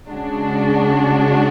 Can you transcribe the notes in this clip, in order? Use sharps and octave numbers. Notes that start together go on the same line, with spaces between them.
C#3 G#3 D4 F#4